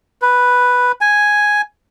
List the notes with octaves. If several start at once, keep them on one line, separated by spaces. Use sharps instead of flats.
B4
G#5